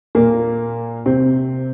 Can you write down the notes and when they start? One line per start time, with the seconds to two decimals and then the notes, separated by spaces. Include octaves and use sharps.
0.15 A#2 A#3
1.06 C3 C4